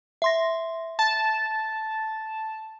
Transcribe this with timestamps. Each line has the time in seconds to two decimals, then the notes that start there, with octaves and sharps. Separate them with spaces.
0.22 E5 C6 A#6
0.99 A5